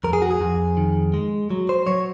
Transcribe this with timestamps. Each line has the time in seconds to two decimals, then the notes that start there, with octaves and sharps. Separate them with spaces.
0.04 F2 A#4
0.13 G#4
0.22 F#4
0.31 G#4
0.41 F2
0.77 D#3
1.14 G#3
1.50 F#3
1.69 C5
1.87 F#3 C#5